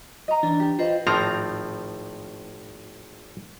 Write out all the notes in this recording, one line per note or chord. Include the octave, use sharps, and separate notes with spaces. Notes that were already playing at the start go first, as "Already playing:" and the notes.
D#5 A#5
E3 D4
G4
F4 B4 C5 D#5
G#1 A2 F3 C4 A#5